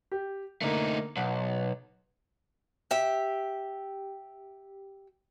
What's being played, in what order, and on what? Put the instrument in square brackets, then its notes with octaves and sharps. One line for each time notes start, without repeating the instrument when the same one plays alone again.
[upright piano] G4
[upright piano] D3 A#3 [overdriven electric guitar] A3 D#4
[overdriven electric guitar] B1 [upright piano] F#5
[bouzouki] G4 E5